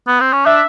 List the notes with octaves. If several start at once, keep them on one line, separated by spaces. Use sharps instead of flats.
B3
C4
C#4
D4 E5